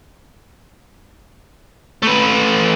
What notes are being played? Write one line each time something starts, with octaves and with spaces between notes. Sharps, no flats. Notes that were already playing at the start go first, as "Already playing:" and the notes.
A3 B4